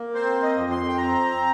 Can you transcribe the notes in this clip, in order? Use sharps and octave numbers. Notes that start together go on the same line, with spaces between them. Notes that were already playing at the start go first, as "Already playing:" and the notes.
Already playing: A#3
C4 C5
D#5
F2
C6
G5
C4 A#5